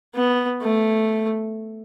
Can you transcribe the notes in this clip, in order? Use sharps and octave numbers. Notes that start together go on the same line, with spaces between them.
B3
A3